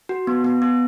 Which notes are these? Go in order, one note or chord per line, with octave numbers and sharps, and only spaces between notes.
F#4
B3
B3
B3